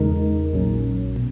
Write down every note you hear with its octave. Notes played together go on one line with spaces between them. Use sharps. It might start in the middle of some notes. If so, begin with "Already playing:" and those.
Already playing: E2 C#3 G#3 D#4 A#4
A#1 A#2 F#3 C#4
B2